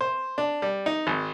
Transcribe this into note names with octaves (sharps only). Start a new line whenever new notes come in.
C5
D4
G3
D#4
G#1